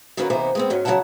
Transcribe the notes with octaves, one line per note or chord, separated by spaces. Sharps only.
D#3 F#3 A#3 C#4 F#4 B4
C3 E3 A#3 B3 D#4 C5
G#3 B3 C4
G#2 F#3 C#4
C#3 F#3 C4 E4 F#5 A5